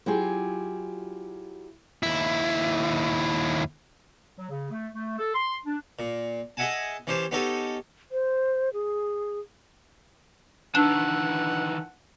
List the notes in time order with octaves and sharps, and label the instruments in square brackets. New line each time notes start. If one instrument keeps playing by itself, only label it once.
[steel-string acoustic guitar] F#3 E4 F4 G4 G#4
[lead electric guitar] D#2 E4
[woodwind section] F#3
C#3
A3
A3
A4
C6
D4
[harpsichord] A#2
G#4 D#5 E5 F#5 G#5 A5
E3 C#4 G4 C5 A5
B3 C#4 D#4 G4 A4
[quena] C5
G#4
[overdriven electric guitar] D#3 E3 [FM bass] D4 [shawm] F#5 [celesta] A5 E6